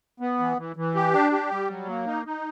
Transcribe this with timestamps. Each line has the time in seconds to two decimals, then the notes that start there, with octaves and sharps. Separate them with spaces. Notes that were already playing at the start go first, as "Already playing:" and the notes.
0.20 B3
0.39 E3
0.58 E3
0.76 E3
0.95 G4
1.14 D4
1.32 G4
1.51 G3
1.70 F#3
1.88 A#3
2.07 D#4
2.26 D#4